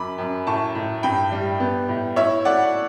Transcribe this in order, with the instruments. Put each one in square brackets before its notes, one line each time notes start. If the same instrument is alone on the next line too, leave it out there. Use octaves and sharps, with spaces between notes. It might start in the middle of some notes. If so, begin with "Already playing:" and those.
Already playing: [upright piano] F#2 B5 D6
F#2
A2 A5 C#6
A2
G2 G5 B5
G3
B3
A2
E4 C#5 E5
A3 D5 F#5